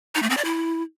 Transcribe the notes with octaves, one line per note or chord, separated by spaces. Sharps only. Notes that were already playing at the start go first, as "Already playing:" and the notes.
D#4
A3
C4
D5
E4